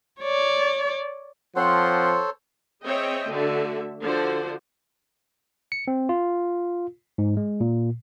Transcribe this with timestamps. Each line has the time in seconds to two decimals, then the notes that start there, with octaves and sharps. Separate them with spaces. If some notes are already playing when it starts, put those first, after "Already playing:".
0.20 C#5 D5
1.56 F3 C4 A4 C5 C#5 F#5 C6
2.85 C4 G#4 C#5 D#5 E5 G5
3.30 D3 A3 F#4 E5
4.02 D3 F3 F#4 C5
5.72 C#7
5.88 C4
6.09 F4
7.18 G#2
7.37 G#3
7.61 A#2